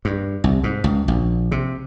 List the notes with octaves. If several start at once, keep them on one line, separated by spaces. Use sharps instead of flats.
G2
C2
G#2
C#2
A#1
C3